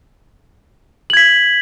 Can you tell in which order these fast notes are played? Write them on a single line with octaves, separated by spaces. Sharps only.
F#7 G#6 B6